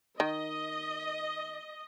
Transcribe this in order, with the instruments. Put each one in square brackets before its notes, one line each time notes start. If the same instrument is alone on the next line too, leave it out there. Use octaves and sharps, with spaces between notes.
[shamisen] D#3 [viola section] D#5